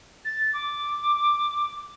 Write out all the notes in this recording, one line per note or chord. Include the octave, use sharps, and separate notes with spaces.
A6
D6